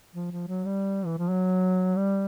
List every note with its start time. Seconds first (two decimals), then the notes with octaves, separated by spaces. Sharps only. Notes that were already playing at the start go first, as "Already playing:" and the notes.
0.15 F3
0.31 F3
0.48 F#3
0.65 G3
1.06 E3
1.18 F3
1.30 F#3
1.97 G3